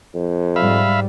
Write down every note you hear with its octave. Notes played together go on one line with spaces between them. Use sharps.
F2
G#2 G3 E5 F5 B5